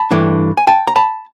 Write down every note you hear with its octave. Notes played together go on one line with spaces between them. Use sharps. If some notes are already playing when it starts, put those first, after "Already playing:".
Already playing: A5 B5
G2 E3 A3 D4
G#5
G5 A5
A#5
A5 B5